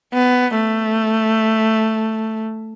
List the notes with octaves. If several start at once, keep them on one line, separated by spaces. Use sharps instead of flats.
B3
A3